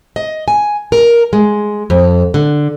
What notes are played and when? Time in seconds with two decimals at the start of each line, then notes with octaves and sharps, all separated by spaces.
0.16 D#5
0.48 G#5
0.92 A#4
1.33 G#3
1.90 F2
2.34 D3